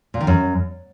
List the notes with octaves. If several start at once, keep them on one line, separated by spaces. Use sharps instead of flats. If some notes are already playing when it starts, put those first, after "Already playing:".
A#2
D#3
F#2